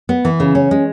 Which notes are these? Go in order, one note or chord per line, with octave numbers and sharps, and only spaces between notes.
B3
E3
C#3
C#4
G#3